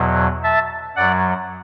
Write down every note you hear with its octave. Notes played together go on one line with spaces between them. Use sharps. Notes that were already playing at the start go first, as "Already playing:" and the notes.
Already playing: E2 B2 F#3
E5 A5
F#2 F#3 D5 F#5